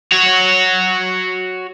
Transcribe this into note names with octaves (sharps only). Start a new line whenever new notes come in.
F#4 C#5